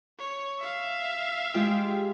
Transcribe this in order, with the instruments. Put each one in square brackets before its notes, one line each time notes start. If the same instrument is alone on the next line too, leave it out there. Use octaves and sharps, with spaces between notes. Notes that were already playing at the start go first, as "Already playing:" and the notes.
[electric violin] C#5
E5 F5
[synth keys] G#3 F4 G4